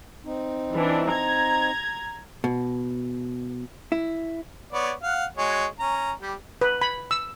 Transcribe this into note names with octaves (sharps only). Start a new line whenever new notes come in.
C4 D#4
E3 D4
A#5 G#6
B2
E4
B3 C#5 D5
F5 F#5
G#3 F#4 C#5
C#4 A#5
G3 G4
B4
B5
E6